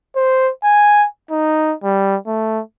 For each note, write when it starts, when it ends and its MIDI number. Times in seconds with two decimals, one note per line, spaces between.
0.16 0.51 72
0.64 1.07 80
1.31 1.74 63
1.84 2.17 55
2.27 2.61 57